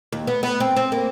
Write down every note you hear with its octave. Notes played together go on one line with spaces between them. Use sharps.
D#2
B3
B3
C4
C4
A#3